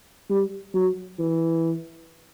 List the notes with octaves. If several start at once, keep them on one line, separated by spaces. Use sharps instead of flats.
G3
F#3
E3